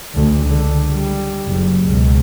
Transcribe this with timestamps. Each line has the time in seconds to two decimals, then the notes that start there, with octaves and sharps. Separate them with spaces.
0.15 D2
0.47 C#2 D3
0.92 G3
1.46 F#1
1.87 C#2 B2